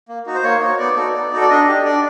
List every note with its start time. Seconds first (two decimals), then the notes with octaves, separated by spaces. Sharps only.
0.09 A#3
0.26 D#4 F#4
0.34 C5
0.44 A#3 C#5
0.62 D#4 F#4
0.79 B3 D5
0.97 D#4 F#4 A4
1.14 B3
1.32 D#4 F#4 A4
1.41 D5
1.50 D4 D#5
1.67 G4
1.85 D4 D5